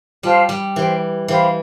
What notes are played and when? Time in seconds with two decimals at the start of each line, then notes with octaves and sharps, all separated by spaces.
0.23 G3 F4 C5 F5 A5
0.49 G3
0.75 E3 G4 C5 G5
1.28 E3 G4 C5 F5 B5